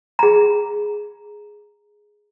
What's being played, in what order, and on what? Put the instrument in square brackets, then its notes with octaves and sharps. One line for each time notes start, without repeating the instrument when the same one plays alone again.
[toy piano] G#4 A#5